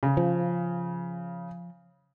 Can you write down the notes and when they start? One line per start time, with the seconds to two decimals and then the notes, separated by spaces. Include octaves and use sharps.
0.03 C#3
0.17 F3